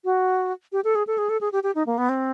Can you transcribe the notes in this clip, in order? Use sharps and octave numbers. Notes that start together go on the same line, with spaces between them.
F#4
G4
A4
G#4
A4
G#4
A4
G#4
G4
G4
D#4
A#3
B3
C4